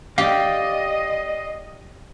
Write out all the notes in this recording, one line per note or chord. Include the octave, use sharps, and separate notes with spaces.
G4 D5 D#5 F5